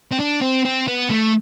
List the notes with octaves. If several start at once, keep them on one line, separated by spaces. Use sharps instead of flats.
C4
D4
C4
C4
B3
A3